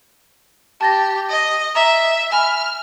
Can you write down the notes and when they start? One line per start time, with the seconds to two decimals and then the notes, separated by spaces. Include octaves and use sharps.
0.81 G4 A5 A6 A#6
1.29 D#5
1.75 E5 A#5
2.32 G#5 B5 F6